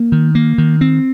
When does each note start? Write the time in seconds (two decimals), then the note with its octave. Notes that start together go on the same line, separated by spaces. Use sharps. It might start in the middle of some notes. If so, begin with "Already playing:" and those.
Already playing: A#3
0.12 D#3
0.35 A#3
0.58 D#3
0.81 C4